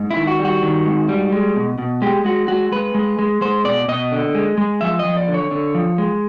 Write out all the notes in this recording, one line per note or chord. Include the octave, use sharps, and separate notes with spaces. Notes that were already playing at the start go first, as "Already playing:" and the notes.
Already playing: G#2
E4
D#3
F#4
G3
F#4
D#3
G#2
G3
G#3
B2
B2
G#3 G4
G#3 F#4
G#3 F#4
G#3 B4
G#3
G#3
G#3 C5
B2 D5
B2 D#5
D3
G#3
G#3
F3 E5
D#5
F3
D5
D3
C#5
D3
F3
G#3